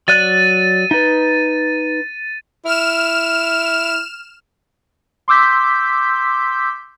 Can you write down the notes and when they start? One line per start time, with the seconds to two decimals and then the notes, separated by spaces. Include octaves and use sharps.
0.08 F#3 D5 F#6 A6 D#7
0.91 D#4 B4
2.65 E4 F6 E7
5.28 C6 D6 E6 G6 B6